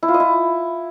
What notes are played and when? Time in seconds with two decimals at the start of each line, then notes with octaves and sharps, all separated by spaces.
0.03 E4
0.08 F4
0.14 D#5
0.20 E4